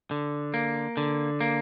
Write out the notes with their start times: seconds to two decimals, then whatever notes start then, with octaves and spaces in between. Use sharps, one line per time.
0.11 D3
0.54 A#3
0.97 D3
1.41 A#3